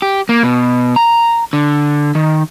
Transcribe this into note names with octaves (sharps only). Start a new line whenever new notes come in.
G4
A#3
B2
A#5
D3
D#3